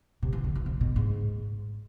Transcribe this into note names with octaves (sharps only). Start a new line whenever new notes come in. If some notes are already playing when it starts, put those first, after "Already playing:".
C3
E3
D3
E3
C3
B2
G#2